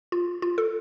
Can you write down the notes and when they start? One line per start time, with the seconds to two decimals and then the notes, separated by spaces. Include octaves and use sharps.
0.12 F4
0.42 F4
0.58 A4